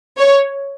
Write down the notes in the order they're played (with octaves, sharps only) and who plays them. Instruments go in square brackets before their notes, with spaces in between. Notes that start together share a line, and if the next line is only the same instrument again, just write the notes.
[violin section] C#5